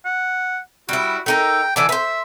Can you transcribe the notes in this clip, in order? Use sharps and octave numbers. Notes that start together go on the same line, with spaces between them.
F#5
G3 E4 F#4
A3 D#4 A#4 G5
D3 E3 D4 D5
B4 C5 E5